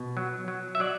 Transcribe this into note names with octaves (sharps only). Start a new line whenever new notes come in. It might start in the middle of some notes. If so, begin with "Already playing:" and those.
Already playing: B2
F#3
F#3
E5
F#3 D5